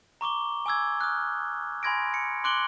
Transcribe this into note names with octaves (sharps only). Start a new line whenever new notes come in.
A#5 C#6 D6 G7
G#5 D6 E6 G#6
D#6 F6 F#6
G#5 B5 C6 G#6 A#6 D7
C#7
C6 D6 F#6 D7 F#7 G7